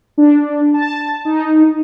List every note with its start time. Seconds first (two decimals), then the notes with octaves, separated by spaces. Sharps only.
0.18 D4
0.74 A5
1.25 D#4